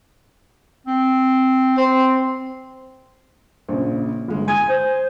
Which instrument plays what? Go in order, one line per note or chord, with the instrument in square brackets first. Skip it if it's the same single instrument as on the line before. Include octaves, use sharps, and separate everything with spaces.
[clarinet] C4
[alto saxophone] C4 [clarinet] C6
[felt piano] A#1 C#3
G1 G#3
[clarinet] G#5 [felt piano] D#6 G#6
[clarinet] C5